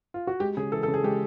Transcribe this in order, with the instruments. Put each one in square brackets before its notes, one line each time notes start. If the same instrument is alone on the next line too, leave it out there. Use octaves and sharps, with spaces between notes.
[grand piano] F4
F#4
G#3 G4
C#3 G#4
E3 A4
A4
C#3
G#4
G#3 G4